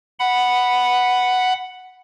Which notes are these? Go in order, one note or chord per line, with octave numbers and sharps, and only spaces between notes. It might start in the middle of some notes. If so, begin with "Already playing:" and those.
F#5 B5